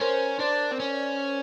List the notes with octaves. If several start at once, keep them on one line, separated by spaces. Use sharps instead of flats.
C#4 A#4 C5
D4 C5 D5
C4
C#4